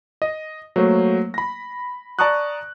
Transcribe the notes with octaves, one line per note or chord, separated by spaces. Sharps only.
D#5
F#3 A3 A#3 C5
B5 A#6
D5 A5 A#5 C#6 D#6 F#6